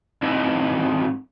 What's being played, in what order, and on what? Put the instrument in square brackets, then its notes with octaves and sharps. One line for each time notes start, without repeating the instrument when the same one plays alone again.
[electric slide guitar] G#2 C4 E4 D#5 E5